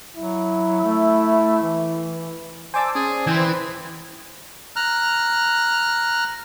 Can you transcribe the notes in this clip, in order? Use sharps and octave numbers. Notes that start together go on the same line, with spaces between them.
F#3 E4
A3
E3
C5 D5 G#5 A5 D6 E6
C#4 G#4
E3 C4 C6 G#6
A#5 F6 F#6